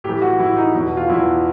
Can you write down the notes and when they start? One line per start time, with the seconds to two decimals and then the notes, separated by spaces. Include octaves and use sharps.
0.04 A2 G4
0.09 E3
0.22 F#4
0.39 E3 E4
0.44 A2
0.57 D#4
0.74 E2 B2
0.97 F4
1.09 E2 B2 E4